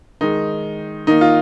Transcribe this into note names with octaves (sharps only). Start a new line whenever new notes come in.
D#3 G#3 D#4
D#3 A#3 D#4
F4